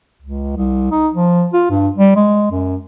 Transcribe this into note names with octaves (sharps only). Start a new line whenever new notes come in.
C#2
C2
D#4
F3
F4
G2
G3
G#3
F#2